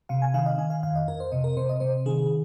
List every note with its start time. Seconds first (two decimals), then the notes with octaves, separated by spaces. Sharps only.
0.09 C3 F5
0.22 G#5
0.34 D#3 F5
0.46 D#5
0.58 D#3 G#5
0.70 F5
0.83 F2 F5
0.95 D#5
1.08 F2 A#4
1.20 C5
1.32 C3 D#5
1.44 A#4
1.57 C3 C5
1.69 D#5
1.80 C3 C5
2.06 D#3 G#4